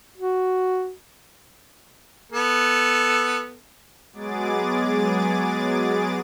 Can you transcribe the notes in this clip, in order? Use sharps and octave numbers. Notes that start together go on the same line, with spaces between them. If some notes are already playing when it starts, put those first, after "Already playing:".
F#4
B3 A4
F#3 G#3 B3 G#4 D6 A6